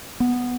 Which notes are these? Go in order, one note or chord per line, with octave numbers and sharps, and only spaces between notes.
B3